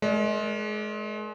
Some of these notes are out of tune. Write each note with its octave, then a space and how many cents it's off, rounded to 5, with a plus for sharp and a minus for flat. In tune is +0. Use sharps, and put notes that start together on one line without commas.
G#3 +35 A#4 +15 D5 +0